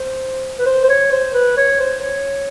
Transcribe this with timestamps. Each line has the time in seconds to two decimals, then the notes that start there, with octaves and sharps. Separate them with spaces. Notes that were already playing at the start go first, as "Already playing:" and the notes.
Already playing: C5
0.58 B4
0.66 C5
0.84 C5
0.89 C#5
1.12 C5
1.34 B4
1.57 C#5
1.80 C5
2.01 C#5